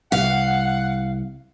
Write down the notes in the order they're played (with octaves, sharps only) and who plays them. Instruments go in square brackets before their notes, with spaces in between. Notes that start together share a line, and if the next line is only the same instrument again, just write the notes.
[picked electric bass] C2 [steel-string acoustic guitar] F5 [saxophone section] F#5